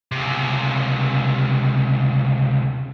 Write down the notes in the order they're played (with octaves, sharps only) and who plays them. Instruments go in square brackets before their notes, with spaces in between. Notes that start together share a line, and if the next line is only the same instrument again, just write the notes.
[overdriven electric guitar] C#2 C3